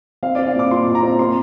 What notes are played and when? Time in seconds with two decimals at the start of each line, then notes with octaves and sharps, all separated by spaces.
0.23 C4 F5
0.35 C4 D5
0.46 F5
0.54 A#2 D6
0.70 A#2 C6
0.87 A#2
0.95 A#5
1.03 C4
1.19 A#3 C6